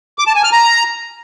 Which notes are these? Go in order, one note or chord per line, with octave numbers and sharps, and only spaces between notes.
D6
A5
G#5
F6
A#5